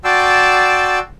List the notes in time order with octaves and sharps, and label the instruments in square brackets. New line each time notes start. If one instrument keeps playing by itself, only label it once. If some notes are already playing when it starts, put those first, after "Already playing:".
[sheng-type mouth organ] F#4 D5 G5 A5 C6 E6